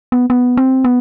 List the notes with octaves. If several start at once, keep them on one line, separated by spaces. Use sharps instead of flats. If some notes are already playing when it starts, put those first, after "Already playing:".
B3
B3
C4
B3